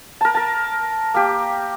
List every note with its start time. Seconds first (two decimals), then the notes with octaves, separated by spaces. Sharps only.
0.21 A#4 A5
0.35 A#4 A5
1.14 A#3 G4